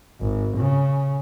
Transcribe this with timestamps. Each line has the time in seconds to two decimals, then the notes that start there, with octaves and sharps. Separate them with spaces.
0.21 G#1
0.57 C#3